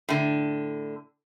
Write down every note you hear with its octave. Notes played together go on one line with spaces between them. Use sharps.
A2 D3